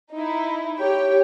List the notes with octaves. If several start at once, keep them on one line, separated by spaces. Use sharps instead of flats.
D#4 E4
G4 C#5 G5